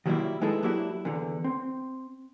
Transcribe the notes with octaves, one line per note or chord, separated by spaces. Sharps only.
D#3 F#3 G3 A3 A#3 E4
G#3 B3 D#4 E4 G#4 A4
F#3 A#3 D4 E4 F#4 G4
E2 D3
C4